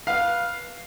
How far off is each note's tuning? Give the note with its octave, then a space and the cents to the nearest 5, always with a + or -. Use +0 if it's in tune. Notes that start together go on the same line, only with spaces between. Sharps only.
B4 -20 F5 -5